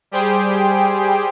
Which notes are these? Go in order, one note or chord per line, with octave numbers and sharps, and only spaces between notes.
G3 G4 G#4 C5 G5 D7